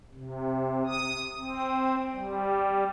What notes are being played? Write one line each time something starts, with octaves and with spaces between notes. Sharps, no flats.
C3
D#6
C4
G3